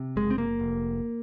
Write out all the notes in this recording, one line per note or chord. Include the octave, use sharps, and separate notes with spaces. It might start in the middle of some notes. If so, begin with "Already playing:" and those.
Already playing: C3
F#1 G#3
C4
A#3
F1